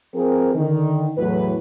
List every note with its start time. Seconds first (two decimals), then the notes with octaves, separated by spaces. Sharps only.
0.15 F3 C4 G#4 A#4
0.55 D3 D#3
1.18 E2 A2 F#3 B4